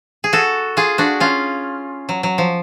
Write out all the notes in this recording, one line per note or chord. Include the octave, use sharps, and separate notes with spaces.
G#4
F#4 A4
F4 G#4
D4 F#4
C#4 F4
F#3
F#3
F3